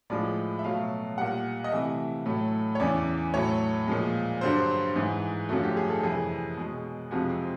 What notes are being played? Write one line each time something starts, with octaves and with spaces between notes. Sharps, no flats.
A2 F3 G#3 D5
E5
B2 F#3 A3 F5
A#2 G3 F#5
D#5
C3 E3 A3 E5
A2 F#3 A3
C#5
E2 C#3 E3 D5
A2 F#3 A3 C#5
A#2 F3 G#3
G2 D3 F#3 C5
G#2 E3 G#3
F#2 D3 F3 A3 F#4
G4
G#4
A4
F2 C3 E3 G#4
B2 G#3
F2 C3 F3 G#3 F#4
C4